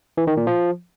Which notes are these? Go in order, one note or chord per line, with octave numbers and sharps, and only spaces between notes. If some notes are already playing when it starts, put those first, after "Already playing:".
E3
D#3
A#2
F3